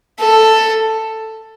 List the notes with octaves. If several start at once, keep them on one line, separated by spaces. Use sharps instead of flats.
A4